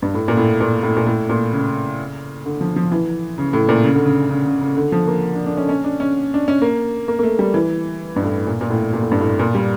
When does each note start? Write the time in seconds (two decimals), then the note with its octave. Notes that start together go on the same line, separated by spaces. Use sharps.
0.02 G2
0.14 A2
0.28 A#2
0.37 A2
0.60 A#2
0.83 A2
0.97 A#2
1.06 A2
1.29 A#2
1.53 C#3
2.45 D3
2.61 F3
2.76 F3
2.92 E3
3.38 C#3
3.53 A2
3.69 A#2
3.84 C#3
3.95 D3
4.06 C#3
4.30 C#3
4.46 C#3
4.61 C#3
4.77 D3
4.92 F3
5.08 A#3
5.35 D4
5.46 D4
5.58 C#4
5.69 C#4
5.84 D4
6.00 C#4
6.34 D4
6.48 C#4
6.62 A#3
7.08 A#3
7.19 A#3
7.23 A3
7.39 G3
7.54 E3
8.16 G2
8.24 A2
8.47 A#2
8.61 A#2
8.70 A2
8.93 A#2
9.02 A2
9.12 G2
9.20 A2
9.39 A#2
9.55 G3